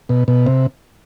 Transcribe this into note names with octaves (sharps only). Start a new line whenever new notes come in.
B2
B2
C3